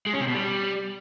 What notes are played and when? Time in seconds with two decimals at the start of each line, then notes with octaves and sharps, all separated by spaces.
0.07 G#3
0.14 C#4
0.20 C3
0.27 B2
0.34 G3